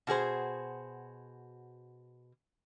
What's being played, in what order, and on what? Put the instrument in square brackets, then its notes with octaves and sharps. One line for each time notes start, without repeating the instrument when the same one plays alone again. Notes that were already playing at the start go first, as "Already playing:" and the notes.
[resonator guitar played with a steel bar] B2 F#4 G#4 C5